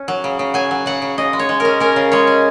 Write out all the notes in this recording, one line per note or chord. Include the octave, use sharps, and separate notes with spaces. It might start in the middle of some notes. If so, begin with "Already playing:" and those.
Already playing: C#4
F#3
C#3
C#3
F#3 G#5
F#3
C#3 F#5
C#3
C#3 D#5
G#3
C#5
G#3
C#4 A#4
C#4 A#4
C#3
G#3 C#5
C#4